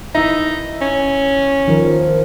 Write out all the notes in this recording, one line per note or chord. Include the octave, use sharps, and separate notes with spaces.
D#4 E4 E5
C#4
D#3 F3 A#4